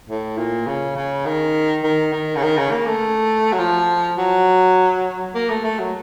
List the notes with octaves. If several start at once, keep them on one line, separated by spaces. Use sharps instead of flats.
A2
A#2
C#3
C#3
D#3
D#3
D#3
C#3
D#3
C#3
A#3
A3
F#3
F3
F#3
A#3
A3
A3
F#3